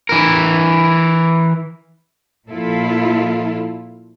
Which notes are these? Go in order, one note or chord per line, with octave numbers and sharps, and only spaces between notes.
E3 A#4
A#2 F3 E4 F4 A4